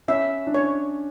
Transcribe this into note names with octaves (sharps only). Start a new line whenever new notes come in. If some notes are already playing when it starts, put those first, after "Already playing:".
C#4 E5
D4
C#4 C#5